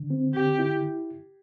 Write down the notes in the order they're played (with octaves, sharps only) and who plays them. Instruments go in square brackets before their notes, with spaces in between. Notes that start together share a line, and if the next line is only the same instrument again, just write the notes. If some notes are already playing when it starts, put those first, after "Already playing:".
Already playing: [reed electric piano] D3
C4
[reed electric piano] D3 [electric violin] G4
[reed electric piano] E4